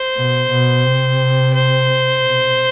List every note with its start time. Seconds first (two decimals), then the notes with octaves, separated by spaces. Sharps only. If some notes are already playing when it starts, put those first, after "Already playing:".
Already playing: C5
0.16 B2
0.51 B2
0.85 C3
1.54 C5
2.22 B2